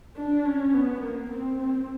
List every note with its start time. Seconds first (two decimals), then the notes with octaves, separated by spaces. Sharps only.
0.16 D4
0.45 C#4
0.74 B3
1.01 A#3
1.30 C4
1.58 C4